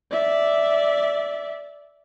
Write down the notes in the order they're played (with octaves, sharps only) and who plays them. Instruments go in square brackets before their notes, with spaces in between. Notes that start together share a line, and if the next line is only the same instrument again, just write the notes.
[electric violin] D5 E5